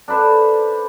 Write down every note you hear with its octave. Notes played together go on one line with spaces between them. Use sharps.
D4 A4 B4 C5